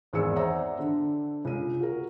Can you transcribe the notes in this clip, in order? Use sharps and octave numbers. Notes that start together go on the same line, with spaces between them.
G#1 E2 G#4 D5 E6 C#7
C5 D5 E5 F#5 A#5 E6
D3
C#2 D#7
F#4 A#4